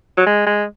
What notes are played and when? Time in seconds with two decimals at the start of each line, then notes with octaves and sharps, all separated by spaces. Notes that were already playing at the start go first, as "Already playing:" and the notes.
0.17 F#3
0.26 G#3
0.46 G#3